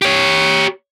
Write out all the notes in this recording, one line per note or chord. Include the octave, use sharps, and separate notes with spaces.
G4 C#5